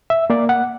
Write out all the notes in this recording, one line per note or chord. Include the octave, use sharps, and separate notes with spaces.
E5
A#3 D5
F#5